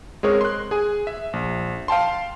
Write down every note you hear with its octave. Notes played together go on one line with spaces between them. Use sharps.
G#3 C4 G#4 A#4 C#5
C6 F#6
G#4 G#5
E5
A#1
F5 G5 A5 C6